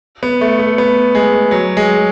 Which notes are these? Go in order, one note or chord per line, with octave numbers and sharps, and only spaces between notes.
B3
A3
A3
B3
G#3
F#3
G#3